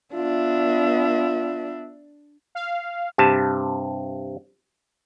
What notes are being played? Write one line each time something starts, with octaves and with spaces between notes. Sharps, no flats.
B3 D4 F4 E5
F5
G2 C3 A5